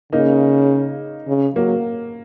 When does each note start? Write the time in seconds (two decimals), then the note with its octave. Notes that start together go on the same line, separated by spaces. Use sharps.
0.12 C#3 A#3 D#4
1.27 C#3
1.56 F#3 A#3